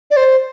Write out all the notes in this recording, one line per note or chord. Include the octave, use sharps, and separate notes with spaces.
D5
C5